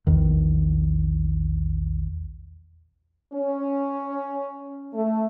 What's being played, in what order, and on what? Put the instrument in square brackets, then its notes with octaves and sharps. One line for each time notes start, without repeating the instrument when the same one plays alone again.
[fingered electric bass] A#1 E2 D#3
[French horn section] C#4
A3